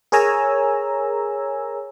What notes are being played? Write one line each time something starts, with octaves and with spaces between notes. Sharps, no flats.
G#4 A#4 C#5 G#5 A#5 E6